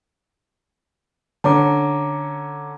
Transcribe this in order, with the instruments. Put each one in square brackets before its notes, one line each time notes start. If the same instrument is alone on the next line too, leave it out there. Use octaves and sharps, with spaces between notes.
[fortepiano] D3 C#4 [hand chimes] A5 A#5 D6